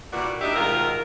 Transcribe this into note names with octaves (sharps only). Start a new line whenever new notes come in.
A#2 E3 G3 F#4 D5
D2 D4 D#4 G4 A#4 E5
G#2 B2 D#3 F4 A#4